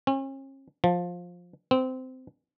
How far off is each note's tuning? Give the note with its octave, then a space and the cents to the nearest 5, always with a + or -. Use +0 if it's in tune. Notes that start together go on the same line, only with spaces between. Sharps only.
C#4 -40
F3 +15
C4 -20